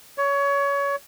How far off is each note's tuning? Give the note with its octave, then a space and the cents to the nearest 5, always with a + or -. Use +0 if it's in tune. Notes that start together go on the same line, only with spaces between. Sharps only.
C#5 +25